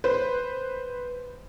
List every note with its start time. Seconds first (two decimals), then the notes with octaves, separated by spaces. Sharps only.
0.04 B4 C5